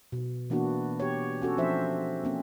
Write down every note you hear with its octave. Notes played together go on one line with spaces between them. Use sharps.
B2
E3 A#3 B3 D4 F#4
G4 C#5
C#4 F#4 A4
F3 C4 D4 C5 E5
A#3 C4 C#4